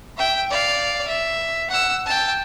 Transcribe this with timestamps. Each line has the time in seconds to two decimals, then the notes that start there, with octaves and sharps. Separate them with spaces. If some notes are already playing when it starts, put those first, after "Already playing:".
0.17 E5 G5
0.50 D5 F5
1.07 E5
1.70 F#5 E6
2.06 G5 A5